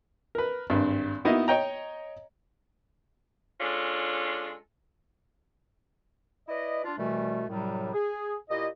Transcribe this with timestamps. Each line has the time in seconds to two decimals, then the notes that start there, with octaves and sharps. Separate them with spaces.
0.35 A#4 B4
0.70 G#1 G2
1.25 A#3 B3 D#4 E4 F#4 D#5
1.48 C#5 D#5 G5 A#5
3.61 G#3 C#4 D4 F4 A4
6.48 E4 B4 D5 D#5
6.84 D4 F4
6.98 C2 B2 E3 G3 A3
7.48 F#2 A2 C3 F#3 G3
7.94 G#4
8.49 A#2 E4 G4 D#5